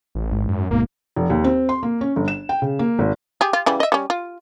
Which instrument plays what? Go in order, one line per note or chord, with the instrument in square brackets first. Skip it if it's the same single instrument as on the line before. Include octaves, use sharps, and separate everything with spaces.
[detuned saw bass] A1
[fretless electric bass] G#2
[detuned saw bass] F#2
[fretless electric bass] D1 G#2 B2 [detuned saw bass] A#3
[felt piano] F1
D#2
C4
C6
A#3
C#4
G1
E7
G5
C#3
A#3
G#1
[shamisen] G4 G#4
F4
C#3 E3 G3
D#5 E5
G3 C#4
F4